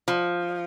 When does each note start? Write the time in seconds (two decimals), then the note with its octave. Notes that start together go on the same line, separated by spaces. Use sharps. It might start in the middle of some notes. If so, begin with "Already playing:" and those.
0.08 F3